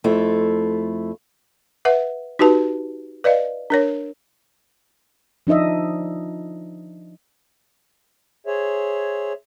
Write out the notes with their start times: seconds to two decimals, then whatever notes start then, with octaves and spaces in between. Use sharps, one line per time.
0.04 F2 A3 E4 F4
1.85 B4 E5 F#5
2.39 D#4 F#4 G4 B4 A5
3.24 B4 D5 D#5 F5
3.70 D4 A#4 C#5
5.47 F3 D4 D#4 D#5 E5
8.47 G#4 C5 C#5 E5